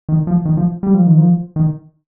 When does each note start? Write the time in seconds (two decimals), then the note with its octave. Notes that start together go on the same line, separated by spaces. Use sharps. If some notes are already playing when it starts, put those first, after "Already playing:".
0.09 D#3
0.27 F3
0.45 D#3
0.57 F3
0.83 G3
0.94 F3
1.07 D#3
1.18 F3
1.56 D#3